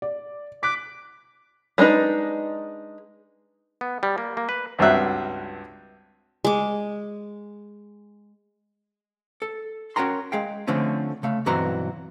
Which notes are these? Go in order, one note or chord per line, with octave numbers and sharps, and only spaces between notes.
D5
D6 F#6 B6
G3 G#3 D4 D#4 B4
B3
G3
A#3
A#3
B4
C#2 G2 C4 F#4 E5 F#6
G#3 D6
A4
C#4 F#4 A#4 G5 A#5 C6
G#3 G#4 F5 G5
D3 F3 A3 C4 C#4
C#3 A3 F5
B1 G2 E3 C4 F#4 A#5